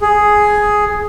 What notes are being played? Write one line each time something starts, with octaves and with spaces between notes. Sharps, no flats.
G#4